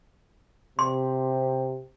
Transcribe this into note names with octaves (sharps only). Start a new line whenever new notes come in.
C3 C6